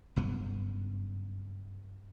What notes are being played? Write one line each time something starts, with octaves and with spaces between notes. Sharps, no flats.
F#1 G2 B3